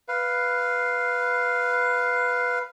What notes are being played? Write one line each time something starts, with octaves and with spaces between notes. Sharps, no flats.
B4 F5